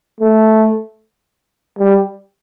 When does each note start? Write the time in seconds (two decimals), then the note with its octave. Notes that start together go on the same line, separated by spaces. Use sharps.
0.21 A3
1.78 G3